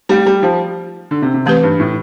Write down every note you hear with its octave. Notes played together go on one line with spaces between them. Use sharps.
G3 A3 C4 G4
G3
F3
D3
C3
C3
E3 A3 C4 G4 B4
G2
A2